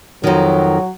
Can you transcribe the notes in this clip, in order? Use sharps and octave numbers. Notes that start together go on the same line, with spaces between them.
F2 D#3 F#3